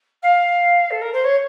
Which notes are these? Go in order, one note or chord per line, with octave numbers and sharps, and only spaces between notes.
F5
A4
A#4
C5
C#5